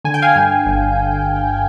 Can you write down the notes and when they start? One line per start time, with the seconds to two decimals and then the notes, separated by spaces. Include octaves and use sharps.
0.04 D3 G#5
0.14 G5
0.22 F5 G#5
0.36 G2
0.66 G1